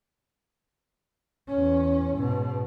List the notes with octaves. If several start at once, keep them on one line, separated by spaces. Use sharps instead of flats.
E2 C#4
G#2 B2